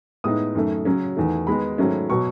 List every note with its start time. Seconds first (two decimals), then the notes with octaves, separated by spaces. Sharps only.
0.24 A2 G#3 B3 D#4 D#6
0.55 F#2 D#3 A3
0.85 C#3 F#3 C#4
1.16 E2 D#3 A3
1.47 D#3 G#3 B3 D#4 B5
1.78 G#2 D#3 F#3 A3 C#4
2.10 B2 F#3 C#6